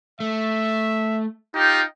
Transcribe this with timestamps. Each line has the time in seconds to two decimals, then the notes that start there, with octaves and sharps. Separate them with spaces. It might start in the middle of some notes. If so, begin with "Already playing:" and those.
0.20 A3 E5
1.55 D#4 F4 G4 G5